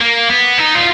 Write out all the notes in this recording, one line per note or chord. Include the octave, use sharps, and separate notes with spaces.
A#3
B3
D#4
F4